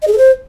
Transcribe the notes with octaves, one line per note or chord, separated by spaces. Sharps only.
D#5
G#4
A4
C5